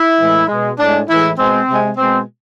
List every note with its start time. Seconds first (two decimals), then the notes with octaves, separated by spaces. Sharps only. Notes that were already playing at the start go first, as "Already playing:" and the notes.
Already playing: E4
0.19 A2 E3 G#3
0.48 B2 G#3
0.79 A2 G#3 D4
1.08 A2 E3 G#3 E4
1.38 B2 G#3 C4
1.68 C3 G#3
1.97 B2 G#3 C4